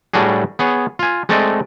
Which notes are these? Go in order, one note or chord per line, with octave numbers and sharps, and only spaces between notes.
A2 G3 D4 F#4 G#4
B3 G#4 C#5
F4 G#5
G#3 A3 C4 A4 D5 D#5